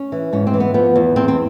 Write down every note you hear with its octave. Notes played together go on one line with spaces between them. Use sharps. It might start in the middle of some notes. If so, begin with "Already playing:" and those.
Already playing: C#4
E3
G#2 C#4
C4
E3
B3
F3 B3
E2
E2 C4
C4